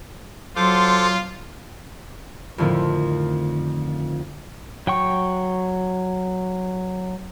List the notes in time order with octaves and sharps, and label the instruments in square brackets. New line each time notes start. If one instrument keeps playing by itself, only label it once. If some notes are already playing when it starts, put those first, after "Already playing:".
[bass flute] F#3 [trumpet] F4 [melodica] A4 C5 D6
[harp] F2 A2 D3 D#3 F3 C4
[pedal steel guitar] F#3 G5 C#6